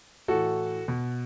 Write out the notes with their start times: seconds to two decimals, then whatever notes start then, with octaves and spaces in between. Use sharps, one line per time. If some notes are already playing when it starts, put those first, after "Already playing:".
0.28 A2 E3 F#4 A4
0.88 B2